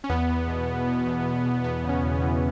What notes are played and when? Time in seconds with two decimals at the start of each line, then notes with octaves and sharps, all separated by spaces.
0.04 C#4
0.09 E2 B3
0.29 E2
0.48 B2
0.68 B2
0.87 B2
1.07 E2
1.25 E2
1.45 B2
1.64 E2 B3
1.84 C#3
1.89 C#4
2.03 E2
2.15 C#4
2.22 E3